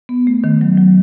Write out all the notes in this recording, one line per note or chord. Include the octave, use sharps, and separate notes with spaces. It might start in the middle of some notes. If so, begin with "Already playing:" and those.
B3
A3
D#3
F#3
F#3